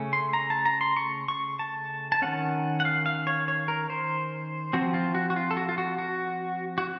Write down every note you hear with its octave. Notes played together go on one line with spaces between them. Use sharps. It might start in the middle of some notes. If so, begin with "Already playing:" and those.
Already playing: C#3 A3 C#4
C6
A#5
A5
A#5
C6
C#6
C#6
A5
A5
D#3 A#3 C#4 F#5
F#5
F5
F5
C#5
C#5
A#4
C5
F3 C4 F#4
F4
F#4
F#4
F4
A4
F#4
F4
F#4
F#4
F#4